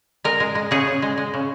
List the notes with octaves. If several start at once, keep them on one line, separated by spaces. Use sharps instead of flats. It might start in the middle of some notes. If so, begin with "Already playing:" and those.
G#3 A#4
G#3
G#3
C#3 G#4
C#3
G#3
G#3
C#3